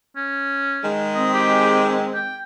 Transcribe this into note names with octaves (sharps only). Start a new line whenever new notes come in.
C#4
D#3 G#3
C4 D#5
G4
G5